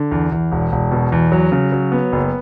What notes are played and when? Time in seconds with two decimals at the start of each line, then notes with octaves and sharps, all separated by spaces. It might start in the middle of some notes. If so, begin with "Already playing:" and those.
Already playing: D3
0.11 E2
0.32 E2
0.52 E1
0.72 E1
0.91 B2
1.12 E2
1.32 F#3
1.52 C#3
1.72 F#3
1.92 B3
2.12 F#1